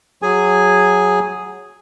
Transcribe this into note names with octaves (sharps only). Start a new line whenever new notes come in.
F#3 G#4 G#5